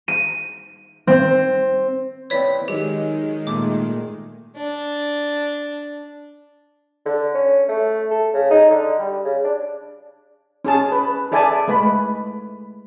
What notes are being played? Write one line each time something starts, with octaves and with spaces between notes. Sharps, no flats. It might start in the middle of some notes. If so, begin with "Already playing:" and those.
D#7
C4
C4 E4 B4 C#5 D5 B6
D#3 F#3 G#3 G4
A#2 A3 D6
D4
D3
C#4
A3
A4
C#3
D#4
D3
G3
C#3
D4
C#4 G#4 A5
B4
G#4 A4 D5 E5 G#5 A5
G#3 A3 B4 B5